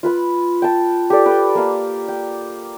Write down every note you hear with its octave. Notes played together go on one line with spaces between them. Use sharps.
F4 B4 B5
G5 A5
G4 A4 D5
B4 G5
A#3 F5
G5